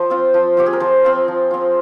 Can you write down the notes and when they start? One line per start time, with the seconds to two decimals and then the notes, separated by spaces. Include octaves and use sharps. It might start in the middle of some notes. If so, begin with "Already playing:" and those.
Already playing: F3 C5
0.10 C4 F4
0.34 F3
0.57 C4 F4 G4
0.66 G#4
0.73 A#4
0.80 F3 C5
1.04 C4 F4
1.28 F3
1.51 C4 F4